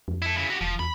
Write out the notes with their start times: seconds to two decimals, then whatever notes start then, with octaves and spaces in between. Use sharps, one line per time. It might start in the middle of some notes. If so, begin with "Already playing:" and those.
0.08 F2
0.22 E4 A4
0.37 C#3 E4
0.50 F#4 G4
0.61 E1 F3
0.79 E2 B5